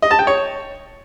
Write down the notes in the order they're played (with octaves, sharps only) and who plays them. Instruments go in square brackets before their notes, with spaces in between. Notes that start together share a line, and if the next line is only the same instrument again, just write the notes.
[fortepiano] D#5
A5
G5
C#5